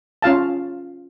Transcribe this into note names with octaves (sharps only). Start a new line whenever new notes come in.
C#4 F4 F5 A5